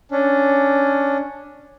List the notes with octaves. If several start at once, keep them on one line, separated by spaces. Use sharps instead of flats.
C#4 D4